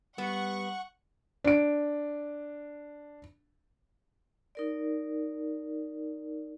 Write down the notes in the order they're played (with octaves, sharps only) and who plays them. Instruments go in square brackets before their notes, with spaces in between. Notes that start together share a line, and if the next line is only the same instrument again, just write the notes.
[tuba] G3 [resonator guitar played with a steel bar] B3 [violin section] F#5 C#6
[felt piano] D4 D7
[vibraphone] D#4 A#4 D5